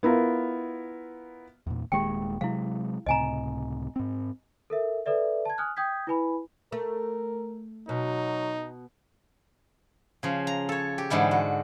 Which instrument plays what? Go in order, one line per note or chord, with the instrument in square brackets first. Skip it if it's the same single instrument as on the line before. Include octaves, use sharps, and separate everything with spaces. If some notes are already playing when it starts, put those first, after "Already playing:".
[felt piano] B3 E4 F4 A#4
[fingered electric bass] E2 A#2
[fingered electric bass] D#1 D#2 G#3 [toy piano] G4 G5
[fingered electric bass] C3 F#3 G#3 [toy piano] E4 F5
[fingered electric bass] C#2 A2 C3 [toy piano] D#5 G#5 A#5
[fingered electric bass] G#2 C4
[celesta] A4 A#4 E5
A4 B4 D5 E5
A5 G#6
G#5 D#6 F6 F#6
G5 D#6 G6 G#6 B6
E4 B4 G#5 B5
[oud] A3 [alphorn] A#4
[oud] B2 [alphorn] F#3 [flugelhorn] D#4
[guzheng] C#3 F3
A#5
A4 C#5
G4
G#2 D3 E3 G3
F#4